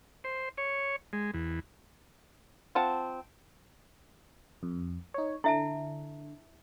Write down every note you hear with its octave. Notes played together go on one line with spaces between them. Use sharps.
C5
C#5
G#3
E2
C4 F4 F#5 A5
F2
D#4 C#5
D3 E4 E5 A5